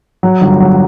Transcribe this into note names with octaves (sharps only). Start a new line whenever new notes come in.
F#3
G1
F#3